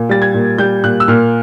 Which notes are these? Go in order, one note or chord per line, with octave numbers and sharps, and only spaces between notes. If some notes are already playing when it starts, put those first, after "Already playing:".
Already playing: A#2
G3 A6
G#6
A#2
G3 G6
A#2 F#6
E6
A#2 F6